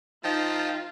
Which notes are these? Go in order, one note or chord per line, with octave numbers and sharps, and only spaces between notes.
F3 D#4 F4 D#5 G5 A5